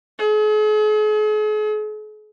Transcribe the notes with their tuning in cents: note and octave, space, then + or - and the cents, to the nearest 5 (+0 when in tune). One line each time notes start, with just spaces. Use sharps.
G#4 +45